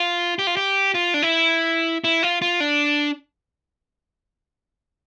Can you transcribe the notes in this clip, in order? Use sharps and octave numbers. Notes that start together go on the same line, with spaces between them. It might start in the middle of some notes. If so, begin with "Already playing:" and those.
Already playing: F4
G4
F4
G4
F4
D4
E4
E4
F4
F4
D4